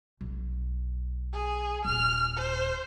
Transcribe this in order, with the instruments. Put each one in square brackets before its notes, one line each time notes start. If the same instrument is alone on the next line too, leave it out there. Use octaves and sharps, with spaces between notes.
[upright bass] B1
[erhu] G#4
[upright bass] D#1 [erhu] F6
[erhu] C5